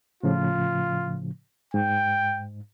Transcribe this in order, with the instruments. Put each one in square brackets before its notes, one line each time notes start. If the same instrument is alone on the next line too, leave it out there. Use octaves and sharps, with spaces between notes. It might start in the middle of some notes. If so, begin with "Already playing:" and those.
[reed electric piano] A2 C#3 F3 [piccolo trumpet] F4
[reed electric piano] G#2 [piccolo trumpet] G5